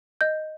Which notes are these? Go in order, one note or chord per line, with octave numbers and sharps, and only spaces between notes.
D#5 G6